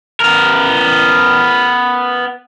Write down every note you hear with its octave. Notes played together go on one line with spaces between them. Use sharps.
B3 A#4